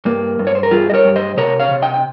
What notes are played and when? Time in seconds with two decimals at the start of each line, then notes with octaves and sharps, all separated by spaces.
0.05 G2 A#3
0.39 G2
0.47 C#5
0.55 C5
0.63 A#4
0.71 G3 F4 G#4
0.90 D#5
0.94 A#4 C#5
1.05 G2
1.16 C5 D#5
1.37 C3 A#4 C#5
1.60 C#5 F5
1.71 C3
1.82 D#5 G5
1.94 G5